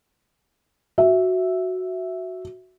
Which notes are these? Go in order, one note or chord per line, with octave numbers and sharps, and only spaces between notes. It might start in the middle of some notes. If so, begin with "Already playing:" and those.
F#4 E5